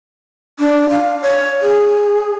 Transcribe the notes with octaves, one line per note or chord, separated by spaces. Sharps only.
D4
F5
C#5
G#4